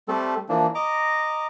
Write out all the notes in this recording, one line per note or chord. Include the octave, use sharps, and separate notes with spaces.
G3 A3 C4 A4
E3 F3 A#3 D4
D#5 A#5 D6